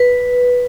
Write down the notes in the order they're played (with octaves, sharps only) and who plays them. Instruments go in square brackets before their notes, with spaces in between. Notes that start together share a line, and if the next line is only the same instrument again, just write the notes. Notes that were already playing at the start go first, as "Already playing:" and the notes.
Already playing: [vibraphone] B4